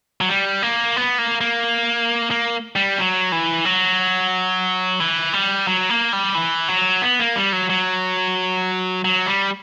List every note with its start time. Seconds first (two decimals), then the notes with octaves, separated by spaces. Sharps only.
0.21 F#3
0.29 G3
0.62 A#3
0.96 B3
1.18 A#3
1.41 A#3
2.31 A#3
2.76 G3
2.99 F#3
3.32 E3
3.65 F#3
5.00 E3
5.33 G3
5.67 F#3
5.90 A#3
6.13 G3
6.35 E3
6.68 F#3
7.02 B3
7.20 A#3
7.36 G3
7.52 F#3
7.70 F#3
9.05 F#3
9.27 G3